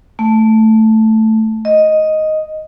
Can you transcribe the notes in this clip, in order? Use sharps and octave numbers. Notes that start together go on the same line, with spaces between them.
A3
D#5